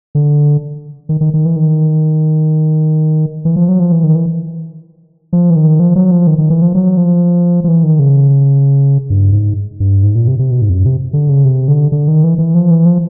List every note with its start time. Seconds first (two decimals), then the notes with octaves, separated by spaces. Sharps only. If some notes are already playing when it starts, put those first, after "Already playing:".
0.15 D3
1.09 D#3
1.21 D#3
1.34 D#3
1.45 E3
1.56 D#3
3.45 E3
3.56 F3
3.69 F#3
3.79 F3
3.92 E3
4.04 D#3
4.15 E3
5.33 F3
5.50 E3
5.56 D#3
5.80 F3
5.96 F#3
6.11 F3
6.27 D#3
6.38 D#3
6.50 E3
6.62 F3
6.75 F#3
6.97 F3
7.64 F3
7.68 E3
7.83 D#3
7.99 C#3
9.10 G2
9.32 G#2
9.80 G2
10.03 G#2
10.15 A#2
10.27 C3
10.39 C3
10.51 B2
10.62 G#2
10.69 F2
10.74 F#2
10.86 C3
11.13 D3
11.29 C#3
11.45 C3
11.68 D3
11.92 D3
12.08 D#3
12.24 E3
12.38 E3
12.55 F3
12.71 E3
12.86 F3